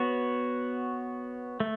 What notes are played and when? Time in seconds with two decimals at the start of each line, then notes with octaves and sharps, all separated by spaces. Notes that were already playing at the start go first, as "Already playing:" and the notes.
Already playing: B3 F#4 C#5
1.60 A3